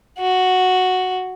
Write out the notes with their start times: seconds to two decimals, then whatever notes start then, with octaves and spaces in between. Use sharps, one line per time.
0.19 F#4